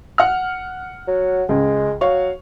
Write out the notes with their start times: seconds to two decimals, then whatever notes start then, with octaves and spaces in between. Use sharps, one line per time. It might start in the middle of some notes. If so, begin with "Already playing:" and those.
0.18 F#5 F6
1.07 F#3
1.49 C#2 G#3
2.01 F#3 C#5 F5 C#6